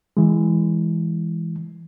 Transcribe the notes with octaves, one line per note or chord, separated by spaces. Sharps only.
E3 G#3